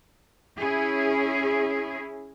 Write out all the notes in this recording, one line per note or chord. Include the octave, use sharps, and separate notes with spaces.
C#4 E4 G#4